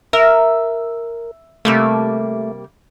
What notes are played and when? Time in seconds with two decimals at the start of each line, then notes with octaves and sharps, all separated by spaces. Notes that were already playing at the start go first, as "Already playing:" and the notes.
0.13 A#4 E5
1.65 C3 G3 A3 A#3